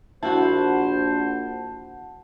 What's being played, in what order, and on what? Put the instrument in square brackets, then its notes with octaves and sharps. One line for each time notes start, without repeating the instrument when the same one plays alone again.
[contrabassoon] A#1 [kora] E4 F#4 [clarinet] C5 [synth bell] F#5 A5